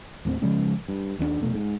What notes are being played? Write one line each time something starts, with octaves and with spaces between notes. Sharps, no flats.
D#2 A2 A3 C4
C#3 F3 G#3 C#4
G2
D#2 D#3 C4 D4
F1 B2 A3
G#2